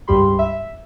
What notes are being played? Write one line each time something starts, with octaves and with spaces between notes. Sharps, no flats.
C#2 G2 G3 G4 B5 C6
E5